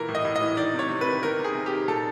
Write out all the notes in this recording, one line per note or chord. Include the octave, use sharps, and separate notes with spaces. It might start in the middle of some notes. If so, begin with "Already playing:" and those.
Already playing: A#2 E3 A#4
A2
D#5
A2
D#5
E3
D#3 D5
C3
C#5
C3
B4
D#3
D#3 A#4
C3
G#4
C3
G4
D#3
A#2 A4